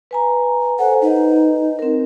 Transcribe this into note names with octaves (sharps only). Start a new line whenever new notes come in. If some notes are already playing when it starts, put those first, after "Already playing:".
B4 G#5 A#5
A4 C5 F#5 G#5
D#4 B4 D#5
C4 A#4